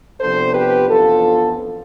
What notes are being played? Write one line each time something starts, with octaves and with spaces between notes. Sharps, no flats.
C3 F3 B3 D4 A4 C5
G4 B4
F2 E3 B3 D4 F4 A4